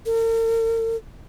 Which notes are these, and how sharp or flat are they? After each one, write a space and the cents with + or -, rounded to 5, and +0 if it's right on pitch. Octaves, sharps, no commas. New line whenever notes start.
A#4 -45